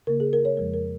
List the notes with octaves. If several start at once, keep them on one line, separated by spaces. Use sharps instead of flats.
C#3 A#3 A#4
G#4
A#4
C#5
F2 F3 G#3 A#4
A#4